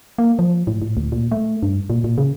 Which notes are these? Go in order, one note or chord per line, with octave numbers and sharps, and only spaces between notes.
A#3
F3
A2
A2
D2
A#2
A3
G2
A#2
A#2
C#3